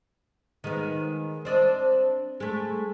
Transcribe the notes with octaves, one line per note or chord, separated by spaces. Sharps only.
D#3 G#3 B3
C4 D4 D#5
G#3 A3